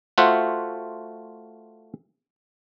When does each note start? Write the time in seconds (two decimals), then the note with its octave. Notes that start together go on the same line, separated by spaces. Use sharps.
0.18 A3 F4 F#4 C5 E5 F#5